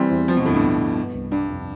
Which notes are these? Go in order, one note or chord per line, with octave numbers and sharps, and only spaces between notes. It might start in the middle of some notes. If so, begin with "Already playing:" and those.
Already playing: C3 E3 G3 C4
E2
F3 C4
B2
D2 A2
G2
B3
G2
B3
C2
G2 D4
F2